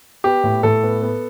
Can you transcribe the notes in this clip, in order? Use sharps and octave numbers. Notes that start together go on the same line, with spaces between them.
B3 G4
A2
A2 A4
B3
B3